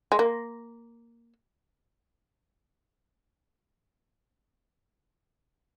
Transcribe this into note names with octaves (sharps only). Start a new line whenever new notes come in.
G#3
A#3